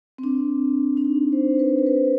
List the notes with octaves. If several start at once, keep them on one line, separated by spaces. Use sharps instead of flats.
C4
D4
D4
D#4
C5
B4
C5
B4